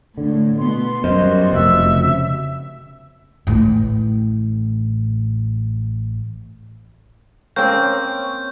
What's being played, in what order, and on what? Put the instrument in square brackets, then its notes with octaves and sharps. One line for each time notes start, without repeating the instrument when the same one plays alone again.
[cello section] A2 [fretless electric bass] D3
[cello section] B2 B3 [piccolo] C6
[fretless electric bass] F#2 [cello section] B2 G3 F#4 [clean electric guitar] A#4 C5 D#5
[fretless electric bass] F1 [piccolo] E5
[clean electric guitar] C#3
[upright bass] A1 A2
[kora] A#3 C4 [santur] C#4 [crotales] G6